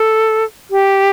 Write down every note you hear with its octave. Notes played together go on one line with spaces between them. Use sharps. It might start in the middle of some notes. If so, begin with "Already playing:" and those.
Already playing: A4
G4